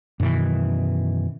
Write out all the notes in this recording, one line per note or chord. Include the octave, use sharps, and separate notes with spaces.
F#2 B2 D#3 E3